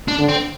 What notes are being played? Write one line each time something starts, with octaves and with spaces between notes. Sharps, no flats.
D4
D3
C4